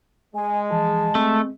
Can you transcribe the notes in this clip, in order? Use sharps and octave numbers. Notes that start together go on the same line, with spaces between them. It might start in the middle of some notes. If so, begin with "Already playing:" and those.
G#3 G#5
E3 F3 G#4 A5
A3 C4